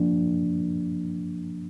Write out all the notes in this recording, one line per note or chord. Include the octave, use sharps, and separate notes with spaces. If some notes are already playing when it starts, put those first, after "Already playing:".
Already playing: F3 A#3 D4